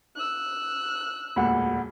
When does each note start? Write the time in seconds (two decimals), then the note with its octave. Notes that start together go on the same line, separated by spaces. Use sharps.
0.16 E6 F#6
1.36 E1 D2 A#2 F#5 B5